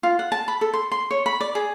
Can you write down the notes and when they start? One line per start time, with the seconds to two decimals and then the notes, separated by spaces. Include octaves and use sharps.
0.03 F4
0.19 F#5
0.32 A5
0.48 B5
0.61 A4
0.74 C6
0.92 C6
1.11 C#5
1.26 B5
1.41 D5
1.55 G#4